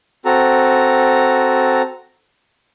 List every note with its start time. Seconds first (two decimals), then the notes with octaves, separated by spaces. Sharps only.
0.25 C4 F#4 A4 A#5